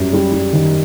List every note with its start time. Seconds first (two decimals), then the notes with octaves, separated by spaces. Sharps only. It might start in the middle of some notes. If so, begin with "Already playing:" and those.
Already playing: F#2 G3
0.13 G3
0.32 G3
0.53 D#3